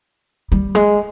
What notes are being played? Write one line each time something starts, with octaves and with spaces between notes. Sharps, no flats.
G3
G#3